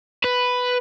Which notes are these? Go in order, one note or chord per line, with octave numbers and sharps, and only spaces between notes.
B4